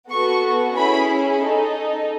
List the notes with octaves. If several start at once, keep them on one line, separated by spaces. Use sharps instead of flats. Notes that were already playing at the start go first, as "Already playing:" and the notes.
B3 F#4 A4 C#6
C#4 E4 G#4 B5
D#4 A4